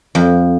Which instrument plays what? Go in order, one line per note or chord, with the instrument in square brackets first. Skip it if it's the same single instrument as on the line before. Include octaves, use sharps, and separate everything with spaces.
[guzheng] F2